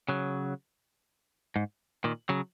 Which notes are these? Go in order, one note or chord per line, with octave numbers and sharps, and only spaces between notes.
C#3 F#3
G#2
A#2 D#3
C#3 F#3